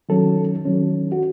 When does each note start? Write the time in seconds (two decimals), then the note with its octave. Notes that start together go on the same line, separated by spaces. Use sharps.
0.09 D#3 F#3 C#4 A4
0.65 D#3 F#3 C#4
1.12 F#4